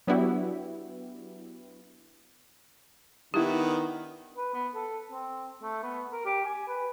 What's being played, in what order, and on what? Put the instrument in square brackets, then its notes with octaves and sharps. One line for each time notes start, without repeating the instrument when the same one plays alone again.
[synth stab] F#3 B3 D4 E4 F#4 G4
[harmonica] D#3 B3 [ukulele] D4 E4 [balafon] G4
[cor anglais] B4
B3
A4
C4
A3
B3
A#4
G4
G#5
B4